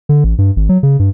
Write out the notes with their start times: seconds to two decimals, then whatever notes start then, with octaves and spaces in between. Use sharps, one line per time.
0.09 D3
0.24 A1
0.38 G2
0.56 G#1
0.69 F#3
0.83 C#3
0.99 G2